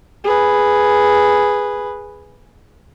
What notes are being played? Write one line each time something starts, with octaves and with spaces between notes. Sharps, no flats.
G#4 B4